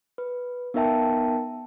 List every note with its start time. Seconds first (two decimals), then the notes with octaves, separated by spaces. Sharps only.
0.18 B4
0.74 B3 D#4 A#4 E5 G5 A5